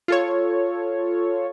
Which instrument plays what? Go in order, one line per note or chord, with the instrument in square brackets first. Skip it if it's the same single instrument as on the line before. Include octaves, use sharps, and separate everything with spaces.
[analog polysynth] F4 A4 C#5